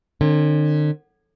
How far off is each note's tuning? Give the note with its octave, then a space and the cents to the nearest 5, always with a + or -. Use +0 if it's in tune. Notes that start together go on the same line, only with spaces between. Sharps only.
D3 +45 C#4 -45